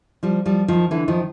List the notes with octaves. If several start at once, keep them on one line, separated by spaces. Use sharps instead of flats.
F3 G3
F3 G3
D#3 F3
D3 E3
D#3 F3